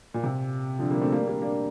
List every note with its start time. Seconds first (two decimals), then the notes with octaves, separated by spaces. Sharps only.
0.14 A#2
0.23 C3
0.79 D3 F3
0.91 G3 A#3
1.01 A3 C4
1.12 G3 A#3
1.27 A#3 D4
1.42 A#3 D4